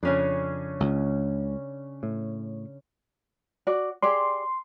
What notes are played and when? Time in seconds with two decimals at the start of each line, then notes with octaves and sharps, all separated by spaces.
0.03 F2 C#3 C#4 D4
0.80 C#2
2.03 A2
3.67 F#4 D5
4.02 G4 G#4 D5 C6